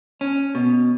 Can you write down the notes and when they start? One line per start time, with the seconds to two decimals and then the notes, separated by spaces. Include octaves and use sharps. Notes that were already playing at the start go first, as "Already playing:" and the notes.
0.21 C#4
0.55 B2